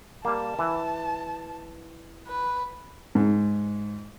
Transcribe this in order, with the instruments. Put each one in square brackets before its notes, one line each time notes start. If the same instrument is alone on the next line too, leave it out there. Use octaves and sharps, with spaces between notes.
[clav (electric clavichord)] G3 A#3 [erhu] A5
[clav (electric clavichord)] E3
[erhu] B4
[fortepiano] G#2